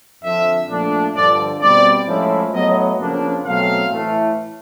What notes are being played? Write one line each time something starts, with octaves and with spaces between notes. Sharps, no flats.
F2 D3 F3 E5
A#2 F3 A3 D4
G2 D3 F3 D5
B2 G3 C4 D5
A2 F3 G#3 C#4 E4
A2 F#3 B3 D#5
F2 C#3 F3 A#3 D4
B2 F#3 A3 C4 F5
A2 E3 A3